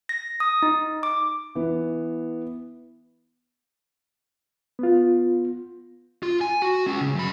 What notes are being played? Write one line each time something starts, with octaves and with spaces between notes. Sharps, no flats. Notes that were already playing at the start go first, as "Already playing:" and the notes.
A#6
D#6
D#4
D6
E3 B3
B3 F4
F4
G#5
F#4
G#3 C#4
C#3
F#2 B5